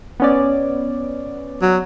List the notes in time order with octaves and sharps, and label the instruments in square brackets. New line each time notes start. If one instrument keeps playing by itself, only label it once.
[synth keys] B3 C#4 D5
[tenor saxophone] F#3